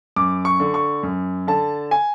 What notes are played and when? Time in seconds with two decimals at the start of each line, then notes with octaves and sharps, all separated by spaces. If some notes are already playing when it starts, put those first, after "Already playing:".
0.16 F#2 D6
0.45 C#6
0.60 D3
0.74 C#6
1.03 F#2
1.47 D3 A5
1.91 G#5